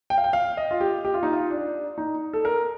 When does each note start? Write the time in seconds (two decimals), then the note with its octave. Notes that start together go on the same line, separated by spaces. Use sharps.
0.10 G5
0.18 F5
0.24 G5
0.33 F5
0.57 D#5
0.71 F4
0.81 G4
1.05 G4
1.14 F4
1.23 D#4
1.33 F4
1.51 D4
1.98 D#4
2.33 A4
2.45 A#4